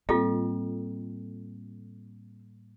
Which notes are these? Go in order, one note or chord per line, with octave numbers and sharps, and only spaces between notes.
A2 G3 A#3 C4 F4 A4 D#5